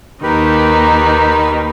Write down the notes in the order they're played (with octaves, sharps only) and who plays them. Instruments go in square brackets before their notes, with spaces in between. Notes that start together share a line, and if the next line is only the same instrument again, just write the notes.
[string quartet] D#2 D#3 D#4 [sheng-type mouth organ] G4 A#4 B4